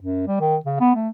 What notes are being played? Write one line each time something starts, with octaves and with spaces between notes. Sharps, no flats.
F#2
G3
D#3
C#3
B3
A3